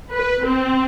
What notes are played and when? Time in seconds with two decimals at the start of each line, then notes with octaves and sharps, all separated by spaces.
0.15 B4
0.45 C4